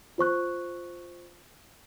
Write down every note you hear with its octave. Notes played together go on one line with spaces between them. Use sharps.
F4 C5 C#6 F#6